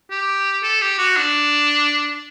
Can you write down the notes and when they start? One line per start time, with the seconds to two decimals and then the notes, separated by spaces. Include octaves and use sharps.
0.11 G4
0.63 A4
0.81 G4
0.98 F#4
1.17 D4